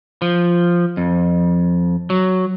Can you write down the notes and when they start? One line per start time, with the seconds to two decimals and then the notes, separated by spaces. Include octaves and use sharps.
0.22 F3
0.97 F2
2.10 F#3